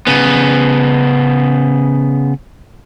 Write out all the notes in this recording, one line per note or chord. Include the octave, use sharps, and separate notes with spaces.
C#3 B3